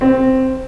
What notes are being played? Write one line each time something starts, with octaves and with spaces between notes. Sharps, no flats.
C4